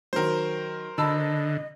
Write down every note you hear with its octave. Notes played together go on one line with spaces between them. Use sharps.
D#3 F#3 A#4 C5
D3 D#5 A5 B5 E6